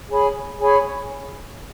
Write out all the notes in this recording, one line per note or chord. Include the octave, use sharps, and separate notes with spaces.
G#4 C#5 G#5 B5
G#4 C#5 G#5 B5